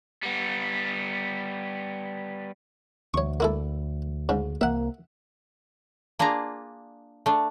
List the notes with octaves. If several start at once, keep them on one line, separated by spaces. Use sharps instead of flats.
G3 B3
D2 C#5 C#6
A#3 E4 A4
G#2 C#3
C2 A#3 E5 F#5
A#3 D4 F4 G#4 A#5
A3 D4